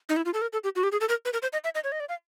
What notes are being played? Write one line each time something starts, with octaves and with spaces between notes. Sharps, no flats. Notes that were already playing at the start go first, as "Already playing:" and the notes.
D#4
E4
F4
A4
A#4
A4
G4
F#4
G4
G#4
A4
A#4
B4
A#4
C5
D#5
E5
D#5
C#5
D#5
D5
F5